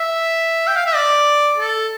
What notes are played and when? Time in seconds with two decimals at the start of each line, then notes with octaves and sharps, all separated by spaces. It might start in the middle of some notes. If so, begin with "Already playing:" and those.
Already playing: E5
0.67 G5
0.76 F5
0.86 E5
0.95 D5
1.58 A4